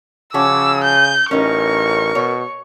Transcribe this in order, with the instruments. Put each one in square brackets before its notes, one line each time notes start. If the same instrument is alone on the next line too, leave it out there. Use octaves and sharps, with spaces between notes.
[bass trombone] C#3 [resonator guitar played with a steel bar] F3 C#4 F#4 [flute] D6 [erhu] E6
[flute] G#5 [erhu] G6
[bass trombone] A1 [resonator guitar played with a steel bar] C#4 D#4 [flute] A#4 [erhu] C#6
[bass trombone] B2 [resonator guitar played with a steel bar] C#5